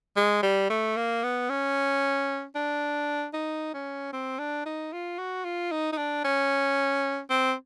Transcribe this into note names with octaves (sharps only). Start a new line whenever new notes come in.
G#3
G3
A3
A#3
B3
C#4
D4
D#4
C#4
C4
D4
D#4
F4
F#4
F4
D#4
D#4
D4
C#4
C4